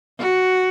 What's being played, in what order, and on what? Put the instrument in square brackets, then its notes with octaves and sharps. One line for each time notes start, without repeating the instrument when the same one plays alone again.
[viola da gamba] F#4